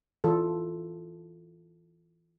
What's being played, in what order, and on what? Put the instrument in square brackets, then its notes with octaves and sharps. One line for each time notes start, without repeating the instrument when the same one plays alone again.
[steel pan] E3 F4 A4